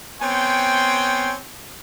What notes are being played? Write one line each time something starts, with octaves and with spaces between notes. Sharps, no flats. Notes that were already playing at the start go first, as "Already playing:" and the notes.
B3 C4 C#5 G5 G#5 C6